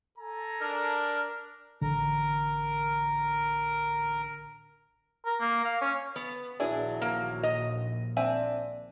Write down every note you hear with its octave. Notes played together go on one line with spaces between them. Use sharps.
A4 G#5 A#5
D4 A#4
A1 D3 A#4
A#4
A#3
F5
C#4
B3
A#1 D#2 F#3 D4 E4 G#4
A#3
D#5
C4 D4 E5 G#5